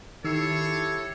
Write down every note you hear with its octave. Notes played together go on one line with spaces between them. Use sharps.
D#3 E4 G4 A4 C#5 E6 C7